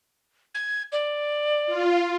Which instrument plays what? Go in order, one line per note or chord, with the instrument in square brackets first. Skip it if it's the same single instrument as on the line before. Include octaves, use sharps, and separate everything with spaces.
[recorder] G#6
D5
[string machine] F4